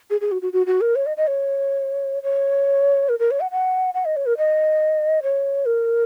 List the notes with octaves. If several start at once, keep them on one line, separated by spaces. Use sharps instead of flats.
G#4
G#4
F#4
F#4
F#4
F#4
A#4
C#5
D#5
D#5
C#5
C#5
A#4
A#4
C#5
F#5
F#5
F#5
D#5
C#5
A#4
D#5
C#5
A#4